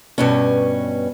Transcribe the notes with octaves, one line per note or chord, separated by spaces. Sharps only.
G2 B2 C#4